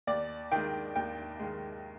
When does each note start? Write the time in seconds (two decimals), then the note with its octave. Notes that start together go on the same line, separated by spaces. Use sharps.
0.07 D#2 D5
0.52 D#3 G#3 G5
0.96 D#2 G5
1.39 D#3 G#3